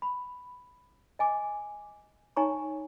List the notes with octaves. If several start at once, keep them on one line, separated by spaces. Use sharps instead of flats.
B5
D#5 G#5 D6
D#4 C#5 G#5 A#5 C#6